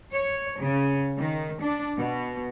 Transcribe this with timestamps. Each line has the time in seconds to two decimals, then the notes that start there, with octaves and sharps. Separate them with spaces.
0.11 C#5
0.61 C#3
1.18 D#3
1.61 D4
1.97 B2